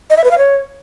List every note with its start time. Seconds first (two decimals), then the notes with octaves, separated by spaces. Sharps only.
0.10 D#5
0.17 E5
0.24 B4
0.31 F5
0.38 C#5